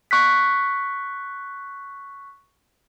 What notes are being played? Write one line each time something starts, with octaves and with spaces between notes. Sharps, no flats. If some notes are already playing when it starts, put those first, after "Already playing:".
C#6 F#6 B6